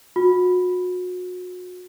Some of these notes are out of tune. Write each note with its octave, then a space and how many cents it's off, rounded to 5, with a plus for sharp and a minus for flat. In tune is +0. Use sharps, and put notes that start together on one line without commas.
F#4 -35